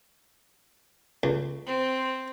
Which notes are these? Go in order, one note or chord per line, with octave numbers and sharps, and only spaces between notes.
C#2
C4